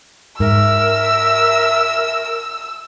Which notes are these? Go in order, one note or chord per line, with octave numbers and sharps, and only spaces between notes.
G#2 A#4 E5 E6